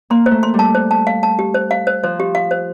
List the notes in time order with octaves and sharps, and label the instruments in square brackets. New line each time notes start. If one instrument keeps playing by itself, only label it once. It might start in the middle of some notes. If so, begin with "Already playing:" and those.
[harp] A#3 [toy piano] C6
[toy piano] C5
[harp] A3
[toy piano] C6
[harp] G3
[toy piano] A5
C5
A5
F5
A5
G4
C5
F5
C5
[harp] F3 [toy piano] C5
[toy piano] G4
F5
C5